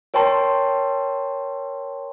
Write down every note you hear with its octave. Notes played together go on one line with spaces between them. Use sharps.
A#4 C#5 G5 A5 C6